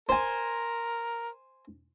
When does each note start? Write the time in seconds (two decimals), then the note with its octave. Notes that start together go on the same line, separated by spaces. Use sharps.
0.09 A#4 C5 G#5